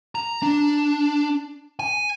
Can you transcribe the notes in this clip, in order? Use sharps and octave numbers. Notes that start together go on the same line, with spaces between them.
A#5
D4
G#5